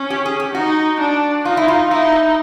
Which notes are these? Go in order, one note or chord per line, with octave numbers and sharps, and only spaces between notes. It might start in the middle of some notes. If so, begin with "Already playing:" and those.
Already playing: C#4
G4
G#4
G4
D#4 F#4
D4
D#4 F4
E4
F4
D#4 E4